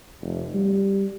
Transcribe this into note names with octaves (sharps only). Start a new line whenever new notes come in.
F1
G3